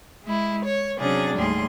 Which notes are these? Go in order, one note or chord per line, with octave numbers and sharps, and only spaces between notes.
G#3 E4
C#5
C3 F#3 C#4 D4 G#4 A6
D#2 A2 G3 G#4 C6